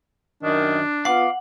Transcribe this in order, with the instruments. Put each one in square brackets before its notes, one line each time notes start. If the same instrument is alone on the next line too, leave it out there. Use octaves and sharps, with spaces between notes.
[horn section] F#2 D#3 [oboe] D4
[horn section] B3 F4 [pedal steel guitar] F5 D6 [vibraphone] F#5